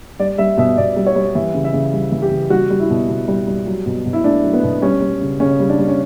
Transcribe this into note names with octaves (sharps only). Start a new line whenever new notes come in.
G3 D5
G3 E5
B2 E5
B2 D5
G3
C#5
G3
E3 E5
C#3
E5
C#3
G3
E3
G4
C#3
G3 F#4
G3
E4
B2
B2
G3
G3
F#3
B2
B2
E4
A3 D4
F#3
B3
B2
G3 C#4
G3
C#3
C#3 C#4
G3
D4
G3
C#4